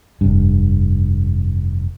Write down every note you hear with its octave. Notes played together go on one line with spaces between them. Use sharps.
F1 G2